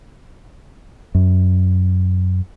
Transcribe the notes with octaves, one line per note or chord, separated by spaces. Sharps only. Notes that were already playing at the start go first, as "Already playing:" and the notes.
F#2